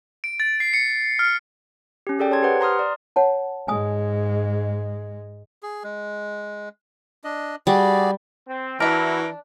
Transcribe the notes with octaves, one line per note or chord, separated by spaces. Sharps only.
D7
A6
C7
C#7
F6
C#4 G4
G#4 A4 D5 G5
C#5 A5 C6 G#6
G4 B4 C5 F#5
A#5 C6 D#6 F6
D5
C#5 F#5 A5
G#2 G#3 G#5 D#6
G#4
G#3
D4 D#5
G3 F#4 G#4 D5
C4
E3 D4 E4 F#4 A#4 E5